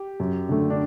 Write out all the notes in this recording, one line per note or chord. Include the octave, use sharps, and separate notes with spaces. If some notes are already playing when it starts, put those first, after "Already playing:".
Already playing: G4
F#2
D3 A3
D4